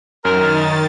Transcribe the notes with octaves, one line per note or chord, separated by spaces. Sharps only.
F#2 D#3 A#4 A6